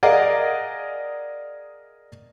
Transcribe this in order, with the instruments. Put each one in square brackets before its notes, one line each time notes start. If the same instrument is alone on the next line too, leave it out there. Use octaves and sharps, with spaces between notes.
[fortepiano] G#4 A#4 D5 D#5 F5 F#5